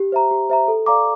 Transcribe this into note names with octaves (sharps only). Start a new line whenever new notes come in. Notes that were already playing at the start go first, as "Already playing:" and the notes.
Already playing: G4
C5 E5 A#5
G4
C5 E5 A#5
A4
D5 F5 A#5 D6